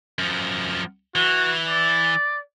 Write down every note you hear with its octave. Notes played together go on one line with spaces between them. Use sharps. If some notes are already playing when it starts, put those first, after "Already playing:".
F#2 F3
E3 F#4
D5